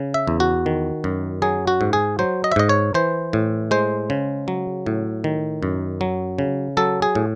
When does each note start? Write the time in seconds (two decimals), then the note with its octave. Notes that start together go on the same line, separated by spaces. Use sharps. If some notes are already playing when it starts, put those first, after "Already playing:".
Already playing: C#3
0.14 E5
0.27 E2
0.40 F#4
0.66 D#3
1.04 F#2
1.42 F#3 G#4
1.67 F#4
1.81 G#2
1.93 G#4
2.19 F#3 C5
2.44 D#5
2.52 E5
2.56 G#2 D#5
2.69 C#5
2.94 E3 C5
3.33 A2
3.71 G#3 C5
4.10 C#3
4.48 F#3
4.86 A2
5.24 D#3
5.63 F#2
6.01 F#3
6.39 C#3
6.77 F#3 A4
7.02 G#4
7.15 A2